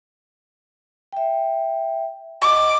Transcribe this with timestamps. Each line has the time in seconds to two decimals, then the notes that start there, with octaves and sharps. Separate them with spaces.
1.13 E5 G5
2.42 D#5 F#5 D6